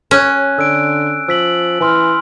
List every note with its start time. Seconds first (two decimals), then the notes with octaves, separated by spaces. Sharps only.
0.11 C#4 G#5 F#6
0.59 D3 E6 D7
1.29 F3 E6 B6 F#7
1.80 E3 G#5 C6 F6